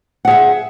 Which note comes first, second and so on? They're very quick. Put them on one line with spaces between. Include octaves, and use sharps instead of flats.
F#5 G#4 E5